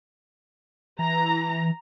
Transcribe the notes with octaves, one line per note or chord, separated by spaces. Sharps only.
E3 A#5